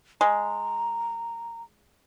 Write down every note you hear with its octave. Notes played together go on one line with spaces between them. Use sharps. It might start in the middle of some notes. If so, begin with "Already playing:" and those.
G#3 A#5